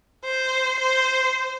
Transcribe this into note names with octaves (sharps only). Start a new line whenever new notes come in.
C5
C5